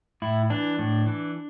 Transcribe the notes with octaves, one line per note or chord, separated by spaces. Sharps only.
A2 E4
E3 D4
A2
E3